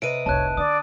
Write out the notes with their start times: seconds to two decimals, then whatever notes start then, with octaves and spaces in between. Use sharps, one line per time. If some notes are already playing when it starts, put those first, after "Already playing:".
0.02 C3 B4 D#5 D7 D#7
0.26 F1 C2 C#5 A5 F#6
0.57 D3 D5 D#6